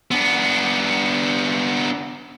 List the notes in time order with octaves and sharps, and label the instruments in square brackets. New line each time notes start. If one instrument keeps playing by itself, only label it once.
[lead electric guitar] B3 D4